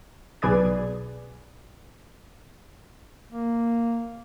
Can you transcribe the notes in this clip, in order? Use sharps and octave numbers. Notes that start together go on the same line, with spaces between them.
B1 G#4 B4 D5 G#6
A#3